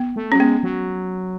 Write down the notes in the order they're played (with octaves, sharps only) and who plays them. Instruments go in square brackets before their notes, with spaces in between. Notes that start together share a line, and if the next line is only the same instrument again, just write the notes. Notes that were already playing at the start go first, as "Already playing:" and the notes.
Already playing: [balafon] B3
[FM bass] A3
[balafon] C#4
[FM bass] F#3
[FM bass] G#3 [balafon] B3
[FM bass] F#3